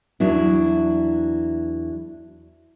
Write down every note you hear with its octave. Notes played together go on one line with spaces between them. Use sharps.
E2 F#3 D4 E4